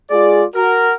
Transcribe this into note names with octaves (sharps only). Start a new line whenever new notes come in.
G#3 F4 G#4 D5
F#4 A#4